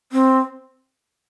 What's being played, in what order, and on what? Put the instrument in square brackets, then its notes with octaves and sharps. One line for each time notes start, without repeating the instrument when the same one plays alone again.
[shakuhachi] C4